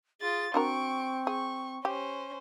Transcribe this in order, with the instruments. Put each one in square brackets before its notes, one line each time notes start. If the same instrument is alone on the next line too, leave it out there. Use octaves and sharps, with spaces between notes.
[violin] F4 A6 [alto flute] G#4
[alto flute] C4 [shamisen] D4 F#4 A#4 [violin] C#6 D7
[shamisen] G#4 [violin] C#6
[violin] C#4 C5 [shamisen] G4